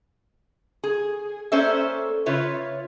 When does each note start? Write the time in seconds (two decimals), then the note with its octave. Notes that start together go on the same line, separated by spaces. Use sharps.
0.84 G#4
1.52 A#3 C#4 A4 C5 D5 E5
2.26 C#3 F4 B4 C#5 E5